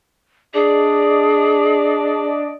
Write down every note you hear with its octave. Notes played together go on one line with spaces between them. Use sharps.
D4 G#4 D5 D#5